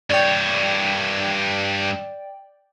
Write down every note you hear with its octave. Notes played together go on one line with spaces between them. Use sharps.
G2 C#5 D5 G5